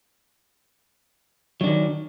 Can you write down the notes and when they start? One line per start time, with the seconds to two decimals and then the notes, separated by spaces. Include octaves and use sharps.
1.61 F#3
1.64 D4
1.67 D#3